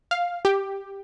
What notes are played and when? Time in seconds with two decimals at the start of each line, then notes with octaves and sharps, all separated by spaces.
0.11 F5
0.45 G4